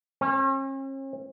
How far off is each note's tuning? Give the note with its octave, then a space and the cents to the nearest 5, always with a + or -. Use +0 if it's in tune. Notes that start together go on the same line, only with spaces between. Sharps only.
C#4 -45